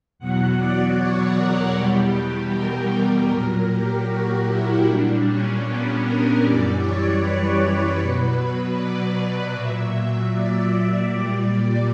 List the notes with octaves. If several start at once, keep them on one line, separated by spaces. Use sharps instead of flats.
E2 B2 F#3 F#5
D5
C#5
A#4
E2 B2 G3 G4
A#4
A#2 F#3 A#4
G4
F#4
E4
A#2 G3 D4
C#4
B3
A#4
F#2 E3 G3 D5
C#5
B4
B2 F#3
D5
A#2 F#3 E5
D5
A#2 G3